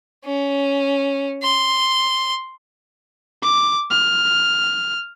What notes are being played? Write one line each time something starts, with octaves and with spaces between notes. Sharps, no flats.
C#4
C6
D6
F6